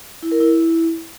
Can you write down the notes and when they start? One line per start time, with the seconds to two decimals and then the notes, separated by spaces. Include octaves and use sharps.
0.23 E4
0.32 A#4
0.41 E4